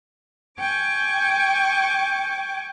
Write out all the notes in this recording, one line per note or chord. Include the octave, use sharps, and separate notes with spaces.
G5 G#5 C#6 D6